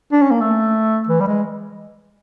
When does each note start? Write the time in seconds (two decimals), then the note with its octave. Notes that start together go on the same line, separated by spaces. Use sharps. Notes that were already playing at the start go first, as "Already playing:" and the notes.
0.12 D4
0.22 C#4
0.31 A#3
0.41 A3
1.09 E3
1.21 G3
1.27 G#3